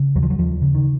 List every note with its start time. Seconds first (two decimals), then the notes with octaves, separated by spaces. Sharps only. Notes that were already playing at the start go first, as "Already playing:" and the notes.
Already playing: C#3
0.15 D#2 F#3
0.23 F3
0.30 F#3
0.38 D#2 F3
0.62 C#3
0.74 D#3